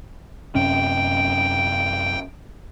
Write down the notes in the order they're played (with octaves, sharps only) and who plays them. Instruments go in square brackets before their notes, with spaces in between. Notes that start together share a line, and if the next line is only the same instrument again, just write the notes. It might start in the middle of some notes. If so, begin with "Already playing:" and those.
[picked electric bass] F#2 C3 C#4 [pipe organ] G5